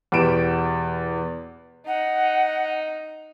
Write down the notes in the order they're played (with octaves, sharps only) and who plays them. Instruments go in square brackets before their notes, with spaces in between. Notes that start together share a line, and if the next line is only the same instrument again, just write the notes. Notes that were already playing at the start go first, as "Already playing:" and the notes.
[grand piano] E2 B2 G4 B4 D7 E7
[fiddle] D#4 [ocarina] F#5